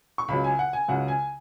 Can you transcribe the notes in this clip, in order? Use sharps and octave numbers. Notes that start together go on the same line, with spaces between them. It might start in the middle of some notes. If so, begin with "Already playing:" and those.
C#6
C#2 C#3 F#3 B5
G#5
F#5
G#5
C#2 C#3 F#3 F#5
G#5